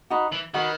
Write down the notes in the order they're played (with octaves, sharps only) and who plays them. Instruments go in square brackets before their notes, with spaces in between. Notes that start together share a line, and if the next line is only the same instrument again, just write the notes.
[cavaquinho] D#4 F#4 B4
[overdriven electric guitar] E3
[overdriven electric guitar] D#3 [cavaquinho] D#4 F#4 B4